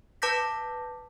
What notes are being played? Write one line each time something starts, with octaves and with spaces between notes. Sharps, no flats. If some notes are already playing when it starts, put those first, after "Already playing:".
B4 A5 D6 G6 A#6 B6